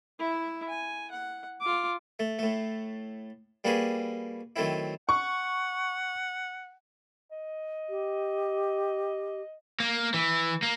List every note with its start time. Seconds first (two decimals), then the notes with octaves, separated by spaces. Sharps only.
0.19 E4 E5
0.69 G#5
1.11 F#5
1.61 F4 D6
2.19 A3
2.39 A2 A3
3.64 G3 A#3 D4 F#4 G#4 B4
4.56 D#3 F#3 A3 C4 E4
5.09 F#5 C#6
7.32 D#5
7.90 G4
9.80 A#3
10.14 E3
10.63 A#3